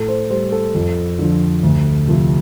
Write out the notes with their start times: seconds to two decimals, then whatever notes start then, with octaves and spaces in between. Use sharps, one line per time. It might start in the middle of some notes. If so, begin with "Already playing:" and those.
Already playing: A2 A4
0.08 C5
0.30 G3 C5
0.52 A4
0.75 F2
1.19 D3 F3
1.63 D2
2.07 C3 F3 A3